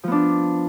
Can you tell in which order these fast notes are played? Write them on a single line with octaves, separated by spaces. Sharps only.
F3 B3 D4